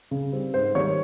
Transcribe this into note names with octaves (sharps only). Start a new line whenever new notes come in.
C#3
G3 C4
G#2 C5
D#3 G3 A#3 C#5